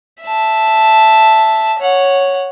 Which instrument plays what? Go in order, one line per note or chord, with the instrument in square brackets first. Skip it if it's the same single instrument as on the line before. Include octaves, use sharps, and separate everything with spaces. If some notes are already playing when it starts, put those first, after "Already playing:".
[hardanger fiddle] E5 A5
C#5 F#5